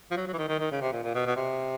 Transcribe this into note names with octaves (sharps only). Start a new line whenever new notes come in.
F3
F#3
F#3
E3
D#3
D#3
D#3
C#3
C3
A#2
A#2
B2
B2
C3